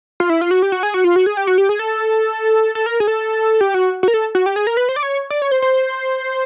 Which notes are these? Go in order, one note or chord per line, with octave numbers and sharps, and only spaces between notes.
F4
E4
F4
F#4
G4
F#4
G#4
F#4
F4
F#4
G#4
G4
F#4
G4
G#4
A4
A4
A#4
G#4
A4
G4
F#4
F#4
A#4
A4
F#4
G4
G#4
A#4
B4
C5
D5
C#5
D5
C#5
C5
C5